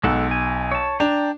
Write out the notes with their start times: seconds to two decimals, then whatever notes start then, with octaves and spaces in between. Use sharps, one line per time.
0.03 B1 G#3 A4 F#5
0.31 G#5
0.72 C#5 A5
1.00 D4 G5 A5 A#5